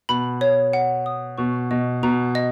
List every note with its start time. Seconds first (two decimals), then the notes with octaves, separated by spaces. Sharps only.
0.09 B2 B5
0.41 C#5
0.73 F#5
1.06 D#6
1.38 B2 C#6
1.71 B2 D#5
2.03 B2 A#5
2.35 D#5